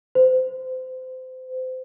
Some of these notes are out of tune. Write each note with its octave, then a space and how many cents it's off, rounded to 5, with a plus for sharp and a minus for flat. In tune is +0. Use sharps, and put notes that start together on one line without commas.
C5 -25